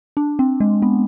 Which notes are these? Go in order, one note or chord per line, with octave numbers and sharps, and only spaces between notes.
D4
C4
G#3
B3